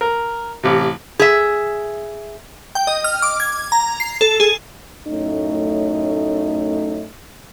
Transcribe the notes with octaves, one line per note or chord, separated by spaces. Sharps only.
A#4
A1 C3
G#4 E5
G5
D#5
F6
D6
G#6
A#5
C7
A4
G#4
F#2 A2 A3 C#4 D#4